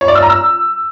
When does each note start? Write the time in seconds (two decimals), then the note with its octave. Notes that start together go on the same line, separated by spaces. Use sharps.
0.01 C#5
0.08 D5
0.15 E6
0.23 A#5
0.30 E6